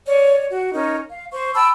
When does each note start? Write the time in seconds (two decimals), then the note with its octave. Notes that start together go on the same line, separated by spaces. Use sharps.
0.06 C#5 D5
0.51 F#4
0.74 C#4 D#4 A#4
1.10 F5
1.32 C5 C#6
1.55 G5 A5 B5 E6